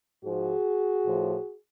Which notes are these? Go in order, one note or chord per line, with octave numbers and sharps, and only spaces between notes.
G#2 F3 F#4 G#4
A2 F3